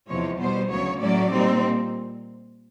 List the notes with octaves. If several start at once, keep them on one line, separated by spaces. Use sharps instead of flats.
E2 C3 F3 G#3 C#5
B2 G3 B3 C5
D2 C#3 F#3 C#5
A2 F#3 A3 C#4 D5
A#2 G3 C4 D#4